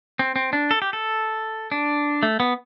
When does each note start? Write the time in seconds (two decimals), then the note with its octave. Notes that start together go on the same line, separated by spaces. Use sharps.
0.19 C4
0.36 C4
0.53 D4
0.71 A4
0.82 G4
0.93 A4
1.72 D4
2.23 A3
2.40 B3